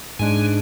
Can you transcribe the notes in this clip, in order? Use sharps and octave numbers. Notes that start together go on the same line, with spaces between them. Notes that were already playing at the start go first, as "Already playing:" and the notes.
G#2 G#3 D4 G#5